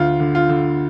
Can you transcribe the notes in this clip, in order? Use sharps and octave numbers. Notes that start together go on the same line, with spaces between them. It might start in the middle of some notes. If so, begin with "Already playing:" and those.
Already playing: D2 F4
D3
F4
D3